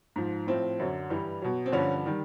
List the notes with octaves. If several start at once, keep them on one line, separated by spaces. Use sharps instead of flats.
G#2 F3
A2 F3 C4
F#2 D3 F#3
G2 E3 G3
B2 F#3
C4
G2 D3 F3 C#4
D#3 G3